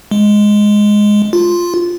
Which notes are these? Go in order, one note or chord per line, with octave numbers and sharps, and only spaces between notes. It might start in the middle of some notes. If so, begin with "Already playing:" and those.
G#3
F4